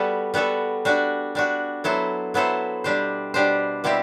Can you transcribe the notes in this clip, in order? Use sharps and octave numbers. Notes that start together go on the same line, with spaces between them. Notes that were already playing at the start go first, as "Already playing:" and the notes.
Already playing: G3 B3 F#4 A4
G3 B3 F#4 A4
G3 D4 F#4
G3 D4 F#4
F#3 B3 E4 A4 C5
F#3 B3 E4 A4 C5
B2 G3 D4 G4 C5
B2 G3 D4 G4 C5
B2 G3 C4 E4 G4